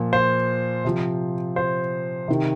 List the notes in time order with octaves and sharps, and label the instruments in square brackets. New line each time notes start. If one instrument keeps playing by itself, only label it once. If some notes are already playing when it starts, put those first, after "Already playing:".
Already playing: [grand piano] A#2 F3
C5
C3 F3
C5
C3 D#3